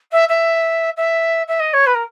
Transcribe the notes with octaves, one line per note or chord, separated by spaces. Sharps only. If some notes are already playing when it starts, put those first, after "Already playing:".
E5
E5
E5
E5
D#5
C#5
B4
A#4